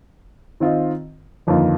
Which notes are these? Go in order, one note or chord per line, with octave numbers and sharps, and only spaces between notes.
D#3 C4 F4 D#5
G1 F2 D#3 A#3 F4